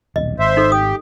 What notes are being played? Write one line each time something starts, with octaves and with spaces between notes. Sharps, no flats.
D#1 B1 D#5
G#1 C5 E5
D#4 A4
G4 D#6